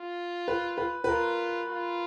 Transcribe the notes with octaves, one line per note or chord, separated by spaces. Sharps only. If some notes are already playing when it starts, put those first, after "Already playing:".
Already playing: F4
B4
B4
B4
F4 A#4
F4